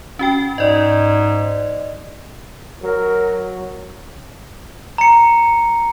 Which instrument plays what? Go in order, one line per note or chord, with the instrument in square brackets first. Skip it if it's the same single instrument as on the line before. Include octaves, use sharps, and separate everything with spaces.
[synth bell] C#4 F#4 G5
[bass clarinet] G#2 [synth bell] D5 D#5
[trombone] F#3 [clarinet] A#4
[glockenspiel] A#5 C#7